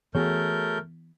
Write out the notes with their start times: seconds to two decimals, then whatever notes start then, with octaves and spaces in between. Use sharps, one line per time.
0.15 E3 A3 B3 F#4 G#4 A#4 C#5 G6